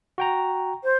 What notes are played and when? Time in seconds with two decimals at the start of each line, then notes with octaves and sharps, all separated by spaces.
0.18 F#4 G5 A#5
0.84 C5